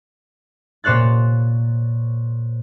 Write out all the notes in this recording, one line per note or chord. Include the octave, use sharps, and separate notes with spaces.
A#2 C5 C#5 F#6 A6